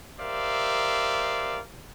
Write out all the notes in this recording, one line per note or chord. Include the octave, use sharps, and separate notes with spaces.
G4 A#4 C5 D5 E5 F5